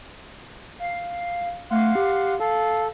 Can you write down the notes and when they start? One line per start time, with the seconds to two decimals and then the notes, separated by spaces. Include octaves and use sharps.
0.79 F5
1.71 A3 F5 F#5 C6
1.95 G4
2.40 A4 F5